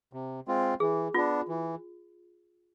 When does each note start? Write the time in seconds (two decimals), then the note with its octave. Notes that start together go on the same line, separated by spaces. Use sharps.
0.13 C3
0.47 G#3 C4 F4
0.80 E3 G#4
1.14 B3 D4 F4
1.48 E3